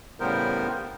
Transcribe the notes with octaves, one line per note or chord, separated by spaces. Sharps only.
A2 C#3 G3 B3 A#4 C5